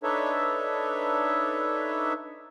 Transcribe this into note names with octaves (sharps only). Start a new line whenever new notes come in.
D4 D#4 A4 B4 C#5 E5